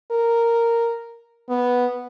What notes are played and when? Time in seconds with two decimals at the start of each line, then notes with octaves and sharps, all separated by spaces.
0.11 A#4
1.49 B3